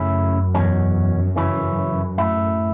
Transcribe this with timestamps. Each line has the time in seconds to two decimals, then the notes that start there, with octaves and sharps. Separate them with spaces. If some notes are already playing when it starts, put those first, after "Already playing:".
Already playing: F#2 C#3 A3 C#4 E4
0.54 E2 B2 F#3 C#4
1.36 C#3 E3 C#4 E4
2.18 A2 A3 E4